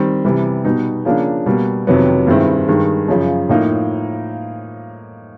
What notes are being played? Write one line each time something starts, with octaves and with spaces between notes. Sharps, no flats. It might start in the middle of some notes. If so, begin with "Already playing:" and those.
Already playing: D#3 G3 C4
C3 E3 G3
B2 G3 B3 D#4
C#3 F3 A#3 D4
B2 G3 A#3
F2 C3 D#3 F#3 B3
G2 D#3 G#3 C4 E4
G2 D#3 G#3
F#2 C#3 F3
A2 F3 A#3 D#4